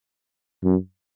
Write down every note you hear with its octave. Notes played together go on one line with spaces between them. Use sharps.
F#2